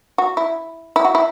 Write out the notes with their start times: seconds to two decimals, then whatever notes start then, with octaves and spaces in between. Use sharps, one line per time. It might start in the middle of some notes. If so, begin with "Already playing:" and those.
0.18 F#4
0.37 E4
0.96 E4
1.05 F#4
1.15 E4